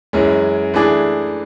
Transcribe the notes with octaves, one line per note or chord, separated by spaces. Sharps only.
F#2 E3 G#3 C#4
E3 A3 D4 G#4